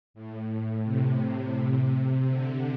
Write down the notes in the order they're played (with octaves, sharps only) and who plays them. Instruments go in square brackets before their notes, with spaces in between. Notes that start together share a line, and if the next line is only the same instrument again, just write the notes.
[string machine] A2
C3
D3